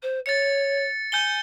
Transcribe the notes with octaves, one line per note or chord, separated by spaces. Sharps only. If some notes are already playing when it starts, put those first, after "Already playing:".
C5
C#5 A6 C#7
G#5 G6 C#7 G7